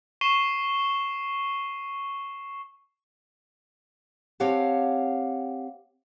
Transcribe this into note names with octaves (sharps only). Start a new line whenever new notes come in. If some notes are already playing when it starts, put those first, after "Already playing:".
C#6 C7 D#7 E7 G7
C4 G4 C#5 F5 F#5 A5